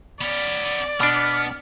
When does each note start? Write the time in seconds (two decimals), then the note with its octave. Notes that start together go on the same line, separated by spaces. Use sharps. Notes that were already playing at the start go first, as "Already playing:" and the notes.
0.21 B3 C#4 D5
1.00 B2 B3 D4 F6